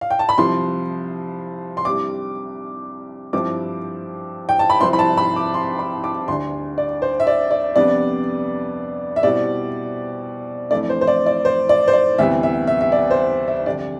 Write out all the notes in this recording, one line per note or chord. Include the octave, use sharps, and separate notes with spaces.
F5
G5
A5
B5
C2 C3 F3 C6
C6
C2 C3 G3 D4 D6
G2 F3 C4 E4 D6
G5
A5
B5
C2 C3 F3 C4 E4 C6
B5
A5
B5
D6
C6
B5
D6
D2 D3 G3 D4 C6
D5
C5
E5
D5
D5
F2 C3 G3 B3 D4 D5
E5
B2 G3 C4 E4 D5
F2 E3 A3 D4 D5
C5
C5
D5
D5
C5
D5
C5
D5
D2 C3 E3 G3 B3 E5
E5
E5
E5
D5
C5
E5
F2 D3 G3 D4 D5